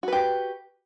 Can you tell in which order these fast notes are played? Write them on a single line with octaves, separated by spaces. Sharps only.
F#4 B4 G4